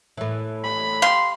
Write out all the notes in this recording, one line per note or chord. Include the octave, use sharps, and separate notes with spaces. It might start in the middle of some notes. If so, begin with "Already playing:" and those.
A2 E3
B5
G4 F5 C6